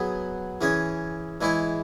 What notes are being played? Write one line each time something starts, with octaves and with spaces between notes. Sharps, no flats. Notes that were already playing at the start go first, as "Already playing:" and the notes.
Already playing: F#3 B3 G#4 B4
E3 C#4 G#4 C#5
E3 G#3 E4 C#5